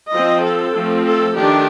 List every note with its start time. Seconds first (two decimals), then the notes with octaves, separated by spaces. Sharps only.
0.12 F3 C4 D#5
0.44 A4
0.73 F3 A3 C4
1.05 A4
1.35 D#3 A3 D4 G4